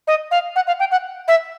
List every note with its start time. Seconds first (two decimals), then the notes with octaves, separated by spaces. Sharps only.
0.07 D#5
0.31 F5
0.56 F#5
0.67 F5
0.79 G5
0.91 F#5
1.28 E5